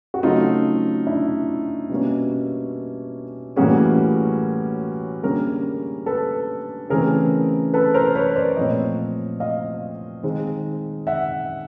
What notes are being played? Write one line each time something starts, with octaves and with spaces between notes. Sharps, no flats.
F#4
C#3 F#3 A3 C4 D#4 F4
D4 E4
B2 G3 A#3 C#4
A2 E3 G3 A#3 C#4 F#4 G#4
D3 G3 A#3 C#4 G#4 A#4
A4 B4
C#3 E3 A3 C4 G#4 A#4
A4 B4
A#4 C5
B4 C#5
C5 D5
A#2 F3 A3 C4 C#5 D#5
D#5 F5
D#3 G#3 C4
E5 F#5